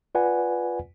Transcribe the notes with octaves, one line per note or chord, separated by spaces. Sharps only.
F4 B4 D5 F#5 G#5